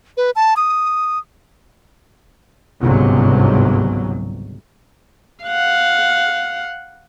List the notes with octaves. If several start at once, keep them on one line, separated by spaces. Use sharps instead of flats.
B4
A5
D#6
G1 C#2 G#2 C3 F#3
F5 F#5